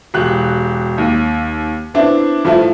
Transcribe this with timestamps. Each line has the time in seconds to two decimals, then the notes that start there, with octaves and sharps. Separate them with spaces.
0.14 E1 G4 F#6
0.98 D#2
1.94 B3 C4 D4 E4
2.44 G2 F3 A3 E4